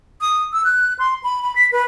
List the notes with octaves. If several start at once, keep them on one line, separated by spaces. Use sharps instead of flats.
D#6
E6
F#6
C6
B5
B5
B6
B4